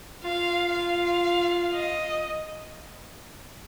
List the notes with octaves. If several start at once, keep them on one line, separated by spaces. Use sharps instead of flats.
F4 F5
F5
D#5